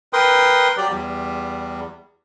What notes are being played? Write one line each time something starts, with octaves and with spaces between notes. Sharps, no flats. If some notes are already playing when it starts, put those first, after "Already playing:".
A#4 B4 G5 C6 D#6
F#3 G4 D5
E2 G3